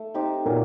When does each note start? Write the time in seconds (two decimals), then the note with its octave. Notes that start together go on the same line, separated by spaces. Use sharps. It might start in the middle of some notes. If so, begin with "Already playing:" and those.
Already playing: A3
0.14 C4 D#4 G4
0.45 A#2 F#3 A#3